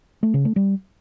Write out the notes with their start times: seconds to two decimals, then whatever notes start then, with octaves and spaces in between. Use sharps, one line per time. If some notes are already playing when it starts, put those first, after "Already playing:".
0.23 A3
0.34 C#3
0.45 A3
0.56 G3